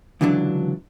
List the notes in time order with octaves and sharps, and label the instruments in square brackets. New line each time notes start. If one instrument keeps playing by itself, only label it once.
[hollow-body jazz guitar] C#2 D3 E3 F#3 D4